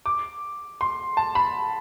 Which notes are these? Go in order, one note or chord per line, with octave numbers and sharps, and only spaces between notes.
D6
C6
A5
B5